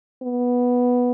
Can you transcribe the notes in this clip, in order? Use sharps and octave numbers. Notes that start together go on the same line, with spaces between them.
B3